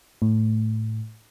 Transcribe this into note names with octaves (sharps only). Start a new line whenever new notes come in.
A2